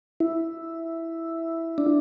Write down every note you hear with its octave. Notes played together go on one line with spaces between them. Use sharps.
E4
D4